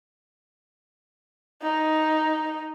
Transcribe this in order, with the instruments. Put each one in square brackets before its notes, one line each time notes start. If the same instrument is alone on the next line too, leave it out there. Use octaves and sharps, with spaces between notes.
[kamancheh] D#4